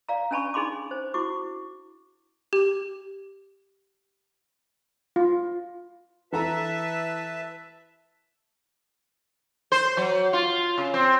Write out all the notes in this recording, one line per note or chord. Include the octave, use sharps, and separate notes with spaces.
D5 F5 A#5
C#4 D4 G#5 A5 B5 C#6
D4 D#4 G#4 B5 C6 D6
C5
E4 F#4 C#6 D6
G4
F4
E3 A4 B4 E5 A5 A#5
C5
F#3
F4
C#3
C4